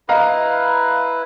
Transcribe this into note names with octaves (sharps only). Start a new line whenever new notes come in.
E4 B4 D#5 F5 A#5